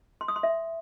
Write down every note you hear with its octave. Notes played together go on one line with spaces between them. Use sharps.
C6
D#6
C6
E5